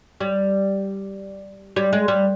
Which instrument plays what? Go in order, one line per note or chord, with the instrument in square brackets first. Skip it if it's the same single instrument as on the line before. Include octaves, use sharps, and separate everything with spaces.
[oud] G3
G3
G#3
G3